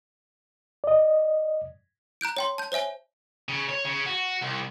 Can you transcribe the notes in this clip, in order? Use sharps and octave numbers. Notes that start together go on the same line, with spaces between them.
D5 D#5
A#5 F#6 G6 D7
C#5 G5 C6
A5 G6
C5 C#5 E5 G#5 G7
C#3
C#5
C#3
F#4
C2